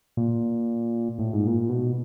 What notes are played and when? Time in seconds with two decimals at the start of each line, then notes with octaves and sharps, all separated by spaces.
0.17 A#2
1.19 A2
1.33 G#2
1.47 A#2
1.69 B2